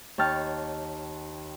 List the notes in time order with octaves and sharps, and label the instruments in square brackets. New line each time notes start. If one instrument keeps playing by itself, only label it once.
[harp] D#2 C#5 G5 A5 F6